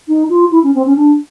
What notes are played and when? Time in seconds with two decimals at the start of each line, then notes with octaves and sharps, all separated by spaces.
0.08 D#4
0.29 F4
0.51 E4
0.63 C#4
0.74 C4
0.85 C#4
0.96 D4